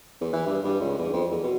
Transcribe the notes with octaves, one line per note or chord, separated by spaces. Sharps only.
E2
E3
G2
G2
C#2
E2
F2
E2
B2